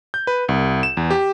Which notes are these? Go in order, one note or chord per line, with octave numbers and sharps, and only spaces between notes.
G6
B4
C2
E7
E2
G4